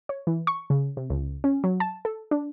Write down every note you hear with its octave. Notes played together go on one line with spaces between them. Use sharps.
C#5
E3
C#6
C#3
C3
C#2
C#4
F#3
A5
A4
D4